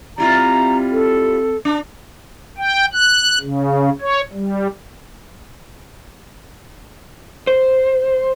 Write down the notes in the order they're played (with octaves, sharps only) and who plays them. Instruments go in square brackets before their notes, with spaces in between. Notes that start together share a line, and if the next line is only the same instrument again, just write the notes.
[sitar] G3 E4 F4 [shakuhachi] C4 [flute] A#5
[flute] A4
[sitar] D4
[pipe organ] G5
F#6
C#3
C#5
G3
[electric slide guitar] C5